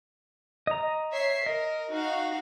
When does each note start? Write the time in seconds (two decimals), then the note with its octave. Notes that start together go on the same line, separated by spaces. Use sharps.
0.67 D#5 A#5
1.13 C#5 E5 C7
1.46 A#4 D#5
1.92 D#4 F#4 F5